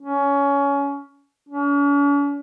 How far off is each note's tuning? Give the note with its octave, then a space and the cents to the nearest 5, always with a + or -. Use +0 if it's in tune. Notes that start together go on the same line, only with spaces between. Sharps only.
C#4 +20
C#4 +45